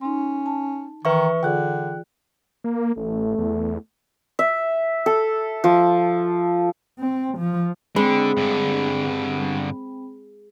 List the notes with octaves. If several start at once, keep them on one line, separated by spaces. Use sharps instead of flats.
C#4 D#4 C6
A5
D#3 E3 B4 E5 C#6 F6
D3 F4 G#4 D5 G5 F#6
A#3
A1 A3
E2
E5
A4
F3
C4
F3
D3 G#3 C4 B5
G2 D3